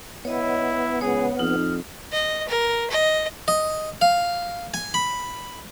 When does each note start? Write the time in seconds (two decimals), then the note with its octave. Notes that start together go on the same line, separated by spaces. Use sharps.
0.25 B3 E4 C#5 D#5
1.01 C#2 G#4 C#5
1.39 F2 D#4 F6
2.12 D#5
2.49 A#4
2.91 D#5
3.48 D#5
4.01 F5
4.74 G#5
4.94 B5